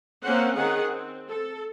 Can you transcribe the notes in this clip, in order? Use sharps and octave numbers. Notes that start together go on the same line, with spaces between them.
A#3 C4 C#4 C5 F#5
D#3 G#4 F#5
C4
A4